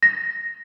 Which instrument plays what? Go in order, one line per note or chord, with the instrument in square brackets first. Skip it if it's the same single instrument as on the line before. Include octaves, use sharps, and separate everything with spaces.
[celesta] A#6